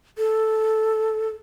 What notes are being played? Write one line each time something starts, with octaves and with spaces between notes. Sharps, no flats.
A4